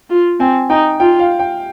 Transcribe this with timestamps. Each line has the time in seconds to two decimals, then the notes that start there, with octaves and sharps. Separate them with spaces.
0.10 F4
0.40 C4 G#5
0.70 D#4 G5
1.00 F4 G5
1.20 F5
1.39 G5